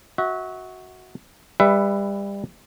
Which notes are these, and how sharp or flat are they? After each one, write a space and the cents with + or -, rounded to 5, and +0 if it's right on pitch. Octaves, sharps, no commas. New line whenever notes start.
F#4 +0 E5 -35
G3 +30 B4 +0 E5 +15